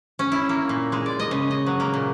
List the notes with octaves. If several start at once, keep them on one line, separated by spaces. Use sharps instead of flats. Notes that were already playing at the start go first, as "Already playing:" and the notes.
C#4
E4
A#3
A#2
G#3
D5
D#5
C#3
D#5
F#3
A#3
A#2